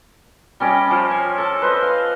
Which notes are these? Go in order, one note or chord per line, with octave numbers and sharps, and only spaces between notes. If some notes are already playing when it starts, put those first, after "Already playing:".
G3 C#4 D5 D#5
F3
G#5
A4 A5
B4 C5 D#5
F5